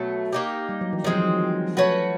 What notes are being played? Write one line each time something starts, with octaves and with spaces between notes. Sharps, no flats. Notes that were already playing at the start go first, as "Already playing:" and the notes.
Already playing: B2 F#3 A3
A#3 D#4 G4
G3
F#3
E3
D#3 F3 G#3 C4
F#3
F3
A3 C#4 F#4 B4